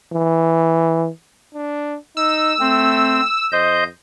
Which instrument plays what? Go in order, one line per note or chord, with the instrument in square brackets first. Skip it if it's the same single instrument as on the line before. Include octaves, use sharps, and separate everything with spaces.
[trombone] E3
D4
[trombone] D#4 [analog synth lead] E6
[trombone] A3 [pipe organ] C4
[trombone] F2 [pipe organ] C5 D#5 G6